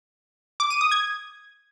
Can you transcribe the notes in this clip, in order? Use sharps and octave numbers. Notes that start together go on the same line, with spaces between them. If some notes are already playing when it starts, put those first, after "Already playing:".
D6
D#7
D#6
G#6